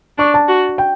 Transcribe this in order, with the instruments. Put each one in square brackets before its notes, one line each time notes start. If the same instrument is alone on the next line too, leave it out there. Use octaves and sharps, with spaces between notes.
[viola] D4 [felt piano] C#6
[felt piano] A5
[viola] F#4
[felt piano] G5